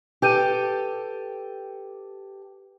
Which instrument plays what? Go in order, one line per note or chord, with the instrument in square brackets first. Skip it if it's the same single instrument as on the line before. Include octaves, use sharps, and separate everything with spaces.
[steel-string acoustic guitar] G4 A4 [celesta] B4 G6 D#7